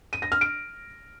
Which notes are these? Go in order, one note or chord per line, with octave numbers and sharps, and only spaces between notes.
D#7
A#6
F6
D7